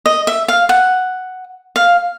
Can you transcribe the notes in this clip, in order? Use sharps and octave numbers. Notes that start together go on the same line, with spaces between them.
D#5
E5
F5
F#5
F5